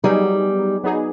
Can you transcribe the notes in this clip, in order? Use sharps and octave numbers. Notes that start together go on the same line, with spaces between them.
F#3 G3 B3 D#4 G#4
F#3 B3 D#4 G#4